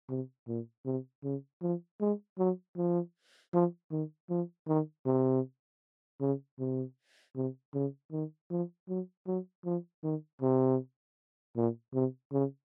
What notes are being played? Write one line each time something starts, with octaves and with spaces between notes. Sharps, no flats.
C3
A#2
C3
C#3
F3
G#3
F#3
F3
F3
D#3
F3
D#3
C3
C#3
C3
C3
C#3
D#3
F3
F#3
F#3
F3
D#3
C3
A#2
C3
C#3